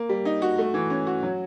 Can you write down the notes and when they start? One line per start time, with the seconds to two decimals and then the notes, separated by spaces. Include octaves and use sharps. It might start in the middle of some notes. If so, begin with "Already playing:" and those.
Already playing: A#3
0.09 G3
0.25 D#4
0.42 F#4
0.58 A3
0.74 E3
0.90 C#4
1.07 F#4
1.23 F#3